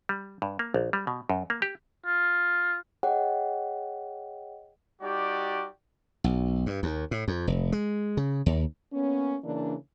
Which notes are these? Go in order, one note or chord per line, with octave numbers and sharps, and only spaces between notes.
G3
G2
A#3
A#1
G3
B2
F#2
A#3
G4
F4
G#4 C#5 D#5 F#5 G5
G3 D#4 F#4 G4 D5
B1
G2
D#2
A2
F2
F1
G#3
C#3
D#2
A#3 B3 C#4
C#3 E3 A#3 D4